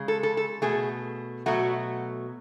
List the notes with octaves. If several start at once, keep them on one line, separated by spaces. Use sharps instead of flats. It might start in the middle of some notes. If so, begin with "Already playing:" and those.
Already playing: C#3 G#3
A4
A4
A4
B2 A3 G#4
B2 F#3 A3 F#4